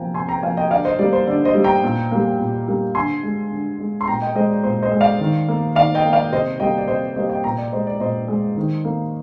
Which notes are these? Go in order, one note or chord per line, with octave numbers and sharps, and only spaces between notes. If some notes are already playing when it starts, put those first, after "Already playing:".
Already playing: C3 F3 A#3 G5 G#5 A#5
C3 G#5 C6
G5 A#5
F3 A#3 F5 G#5
D#5 G5
D3 D5 F5
C5 D#5
G3 A#3 D5
C5
D3 D5
C5 D#5
G3 A#3
G5 A#5
A#2
G3 A#3
A#2
G3 A#3
D3 G#5 C6
G#3
D3
G#3
C6
A#2 G5 A#5
D#5 G5
G#3 C5 D#5
D5
A#2 C5
C5 D#5
G#3
D5 F5
D#3
A#3
D#3 D5 F5
D#5 G5
A#3
D5 F5
C3 C5 D#5
G3 A#3 D#5 G5
D5
C3 C5 D#5
G3 A#3 C5 D#5
D#5 G5
A#2 G5 A#5
D5
G#3 C5 D#5
D5
A#2 C5 D#5
G#3
D#3
A#3